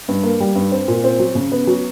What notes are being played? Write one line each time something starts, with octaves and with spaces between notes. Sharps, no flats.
G2
A#3
G3
G2
C4
A#2
C4
F#3
C#3
B3
F#3